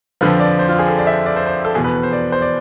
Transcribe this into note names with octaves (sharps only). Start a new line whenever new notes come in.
F2 D3 F3 B4
D5
C5
F4
G#4
A4
D5
E5
D5
C5
C5
A4
E2 B2 G#4
B4
B4
C5
D5
C5
D5